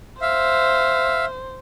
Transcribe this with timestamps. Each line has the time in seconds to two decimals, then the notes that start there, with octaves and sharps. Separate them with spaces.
0.22 C5 E5 F5